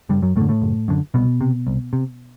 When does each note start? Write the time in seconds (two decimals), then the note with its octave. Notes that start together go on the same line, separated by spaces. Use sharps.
0.09 F#1 G2 G3
0.22 F#2 F#3
0.36 F#2 A2 A3
0.40 D3
0.49 A2 A3
0.62 F#1
0.88 F#2 D3
1.14 C2 B2 B3
1.41 C3
1.67 C2
1.93 C3